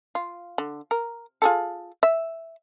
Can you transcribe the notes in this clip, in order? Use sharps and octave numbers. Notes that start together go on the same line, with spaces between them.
F4
D3
A#4
F4 G#4 A4
E5